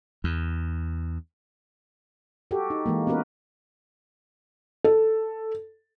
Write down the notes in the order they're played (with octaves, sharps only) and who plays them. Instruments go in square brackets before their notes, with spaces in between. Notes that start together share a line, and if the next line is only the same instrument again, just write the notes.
[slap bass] E2
[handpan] F#4 G4 A4
D#4
E3 G#3 A#3
B3 C#4 F#4 A#4 B4
[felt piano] A4